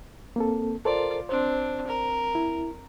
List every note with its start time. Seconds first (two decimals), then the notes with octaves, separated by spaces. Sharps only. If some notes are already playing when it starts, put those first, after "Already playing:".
0.36 A#3 C4 A4
0.85 F4 A4 A#4 C5 D5
1.29 C4 D4 C5
1.87 A#4
2.35 E4